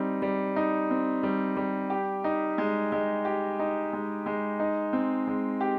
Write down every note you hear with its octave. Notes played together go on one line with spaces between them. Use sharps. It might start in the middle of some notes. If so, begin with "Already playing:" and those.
Already playing: G3 C4 D#4
G3
D#4
C4
G3
G3
G4
D#4
G#3
G#3
G4
D#4
G#3
G#3
D#4
C4
G#3
G4